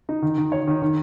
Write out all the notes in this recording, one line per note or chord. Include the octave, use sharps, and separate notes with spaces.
D#4
D#3
D#3
C#5
D#3
D#3